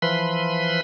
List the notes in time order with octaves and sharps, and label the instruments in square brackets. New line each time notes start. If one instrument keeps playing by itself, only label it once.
[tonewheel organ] E3 F3 B4 B5 C6